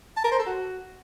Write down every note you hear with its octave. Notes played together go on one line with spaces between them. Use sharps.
A5
A#4
C5
A4
F#4